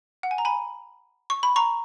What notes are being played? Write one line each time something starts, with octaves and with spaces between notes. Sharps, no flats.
F#5
G#5
A#5
G#5 B5
C#6
B5
A#5 C#6